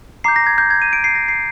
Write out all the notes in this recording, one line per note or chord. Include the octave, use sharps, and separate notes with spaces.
A#5 D6 G6 C7
A#6
G#6
G6
G#6
D#7
D7
C7
A#6
C7